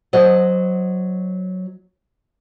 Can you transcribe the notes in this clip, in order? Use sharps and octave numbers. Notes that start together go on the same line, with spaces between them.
F#3 F#4 C5 D#5